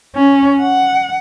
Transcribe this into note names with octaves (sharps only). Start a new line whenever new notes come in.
C#4
F#5